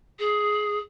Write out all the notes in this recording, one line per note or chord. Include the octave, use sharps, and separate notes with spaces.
G#4